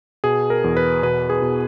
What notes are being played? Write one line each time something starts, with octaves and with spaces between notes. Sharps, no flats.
B2 G#4
A#4
E2
B4
B2 B4
G#4
B2